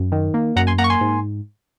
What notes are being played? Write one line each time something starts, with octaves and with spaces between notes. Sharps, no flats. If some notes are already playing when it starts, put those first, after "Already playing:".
Already playing: F#2
D#3
A#3
F#2 F#5 A#5
G#5 C6
A#3 F#5 A#5
C#6
G#5 C6
G#2